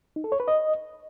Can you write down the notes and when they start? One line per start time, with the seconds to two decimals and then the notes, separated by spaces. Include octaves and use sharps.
0.16 D#4
0.24 A4
0.32 C#5
0.40 B4
0.48 D#5